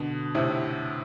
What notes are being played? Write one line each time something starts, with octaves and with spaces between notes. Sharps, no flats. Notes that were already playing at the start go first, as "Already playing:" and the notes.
Already playing: B2 D3
A2 C3